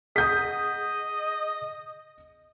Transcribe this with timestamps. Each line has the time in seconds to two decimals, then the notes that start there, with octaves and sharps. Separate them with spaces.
0.16 G#4 D#5 F#5 D#6 G6 B6